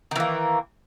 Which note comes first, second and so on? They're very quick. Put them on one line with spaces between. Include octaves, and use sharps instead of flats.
D#3 E3 A#3